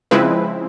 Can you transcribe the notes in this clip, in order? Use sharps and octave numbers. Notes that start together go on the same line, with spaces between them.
C#3 F3 G#3 C4 E4 B4